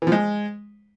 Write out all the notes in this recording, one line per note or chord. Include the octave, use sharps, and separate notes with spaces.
E3
F3
G#3